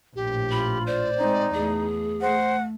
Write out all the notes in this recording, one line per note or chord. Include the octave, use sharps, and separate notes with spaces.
A#1 A2 G4
F4 B5
C5 D5
G#3 C4 D#4
E2 A3 G#4
A3 C5 F#5